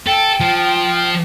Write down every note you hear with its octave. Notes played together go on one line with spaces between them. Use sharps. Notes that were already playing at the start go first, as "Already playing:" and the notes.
A4 G5
F3